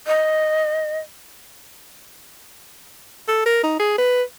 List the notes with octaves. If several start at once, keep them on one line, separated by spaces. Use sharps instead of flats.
D#5
A4
A#4
D#4
G#4
B4